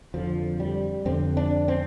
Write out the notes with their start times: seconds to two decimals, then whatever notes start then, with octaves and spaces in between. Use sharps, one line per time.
0.14 F2 D3 F3
0.60 G3
1.05 F2 D3 C4
1.37 D4
1.68 C4